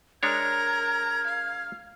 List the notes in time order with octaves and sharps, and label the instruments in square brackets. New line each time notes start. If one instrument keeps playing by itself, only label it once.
[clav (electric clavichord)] G#3 D4 C#5 [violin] A#4 A#5 [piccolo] F6 [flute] G#6
[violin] F5